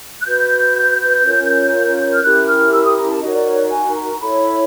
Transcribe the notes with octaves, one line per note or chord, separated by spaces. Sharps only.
F#6
F#4 B4 G6
C#4 F4 A#4 C#5
F6
C#4 E4 G4 A#4 F#6
F6
E6
D#6
A#5
A5
D#4 F#4 A#4 C#5 D#5
D5
C#5
D5
G#5
A#5
E4 A4 C#5 B5